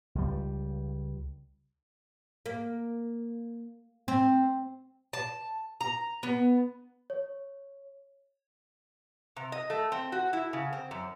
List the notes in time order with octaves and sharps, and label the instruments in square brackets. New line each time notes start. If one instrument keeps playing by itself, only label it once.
[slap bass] C#2 G3
[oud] A#3
C4
[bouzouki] A5
A#5
B3
[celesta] C#5
[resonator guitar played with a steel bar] C3
D#5
A3
C4
F#4
E4
C#3
C4
F#2